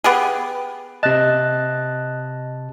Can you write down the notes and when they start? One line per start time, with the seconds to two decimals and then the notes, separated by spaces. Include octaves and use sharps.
0.04 B3 G4 G#4
1.03 C3 D#5 A5 F#6